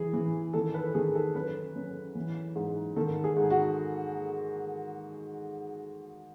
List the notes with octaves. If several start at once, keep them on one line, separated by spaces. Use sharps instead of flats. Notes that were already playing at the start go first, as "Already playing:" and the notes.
Already playing: E3 G#4
E3
D#3 A4
B4
D#3 G#4
A4
F#2 B4
F#2
E3
G#2
D#3 A4
G#4
G#2
F#4